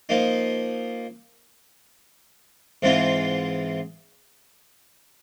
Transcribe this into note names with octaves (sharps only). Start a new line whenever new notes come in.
F3 A#3 D#4
G#2 E3 G#3 C4 F4